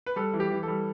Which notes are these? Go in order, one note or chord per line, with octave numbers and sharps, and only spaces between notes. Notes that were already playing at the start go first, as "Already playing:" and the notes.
B4
G3 A4
E3
G4
E3
G3 A4